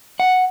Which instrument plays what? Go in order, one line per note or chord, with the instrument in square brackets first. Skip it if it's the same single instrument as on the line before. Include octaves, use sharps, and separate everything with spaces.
[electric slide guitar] F#5